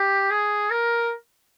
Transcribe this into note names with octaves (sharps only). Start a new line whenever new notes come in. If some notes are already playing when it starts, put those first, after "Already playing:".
Already playing: G4
G#4
A#4